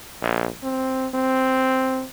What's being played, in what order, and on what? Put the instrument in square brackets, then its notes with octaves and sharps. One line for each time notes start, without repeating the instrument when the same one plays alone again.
[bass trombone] A#1
C4
C4